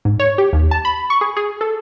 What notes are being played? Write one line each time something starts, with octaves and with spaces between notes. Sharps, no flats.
G#2
C#5
G4
D#2
A5
B5
C#6
G#4
G#4
A4